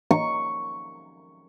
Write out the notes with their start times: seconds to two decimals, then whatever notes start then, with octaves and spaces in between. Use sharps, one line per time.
0.11 C#6